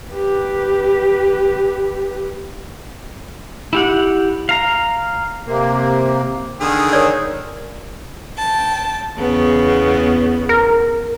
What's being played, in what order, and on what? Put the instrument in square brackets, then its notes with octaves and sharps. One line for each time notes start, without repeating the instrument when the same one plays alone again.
[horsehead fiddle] G4 B4
[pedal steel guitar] E4 G4 F#5
F5 A#5
[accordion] C3 A#3
[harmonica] D3 D#3 G#4
[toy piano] A#4 C#5 D5
[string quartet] G5 A5
E2 C#3 B3
[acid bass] A#4